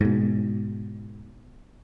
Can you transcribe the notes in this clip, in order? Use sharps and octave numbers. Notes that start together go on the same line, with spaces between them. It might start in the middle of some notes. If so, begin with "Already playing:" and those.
G#2 B2